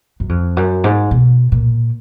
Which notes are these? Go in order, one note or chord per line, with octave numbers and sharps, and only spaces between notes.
F#2
F2
F#2
G#2
B2
A#2